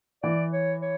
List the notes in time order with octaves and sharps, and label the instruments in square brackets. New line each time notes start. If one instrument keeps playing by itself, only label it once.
[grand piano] E3 [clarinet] D5
[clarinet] C#5
C#5